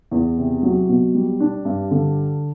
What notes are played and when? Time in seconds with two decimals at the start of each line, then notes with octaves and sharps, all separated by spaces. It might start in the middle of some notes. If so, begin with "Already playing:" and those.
0.11 E2
0.38 C3
0.63 F#3
0.89 B2
1.15 G3
1.40 D4
1.65 G2
1.91 D3